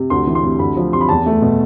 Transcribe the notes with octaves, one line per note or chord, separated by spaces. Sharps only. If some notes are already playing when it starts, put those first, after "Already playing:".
Already playing: C3
D2 C6
E3
C6
C3
D2 B5
F3
C3 C6
B5
E2 A5
A3
B2